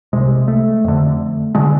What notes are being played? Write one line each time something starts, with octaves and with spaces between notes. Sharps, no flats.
C2 C3 G#3
A3
F2 D3
D3 G#3